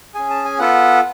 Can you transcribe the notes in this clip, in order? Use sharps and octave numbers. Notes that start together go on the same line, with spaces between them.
C#4 G#4 G#5
A5
G#5
B3 F4 A4 F#5